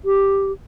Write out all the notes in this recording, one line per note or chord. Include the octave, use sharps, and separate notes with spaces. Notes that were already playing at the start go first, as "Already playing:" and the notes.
G4